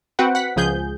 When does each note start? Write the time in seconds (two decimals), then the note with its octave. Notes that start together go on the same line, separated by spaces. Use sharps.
0.19 C4 F#4 B4 F#5 G5
0.35 F#5 B6
0.56 C#2 F3 G#4 G6